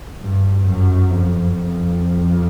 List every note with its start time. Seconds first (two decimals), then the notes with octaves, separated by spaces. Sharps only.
0.22 G2
0.67 F#2
1.10 F2
1.55 F2